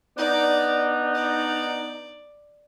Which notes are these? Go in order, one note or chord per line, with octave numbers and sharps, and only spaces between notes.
B3 D4 D#4 D5
D5